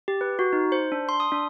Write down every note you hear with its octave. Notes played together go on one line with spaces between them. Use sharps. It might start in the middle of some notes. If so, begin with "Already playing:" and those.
G4
B4
F#4
D#4
C5
D4
C6
D#6
D4